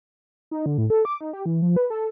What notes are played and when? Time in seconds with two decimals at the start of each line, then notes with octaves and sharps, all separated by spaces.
0.51 D#4
0.66 D3
0.78 A2
0.90 A4
1.05 D6
1.21 D#4
1.33 G4
1.46 E3
1.62 F3
1.76 B4
1.90 A4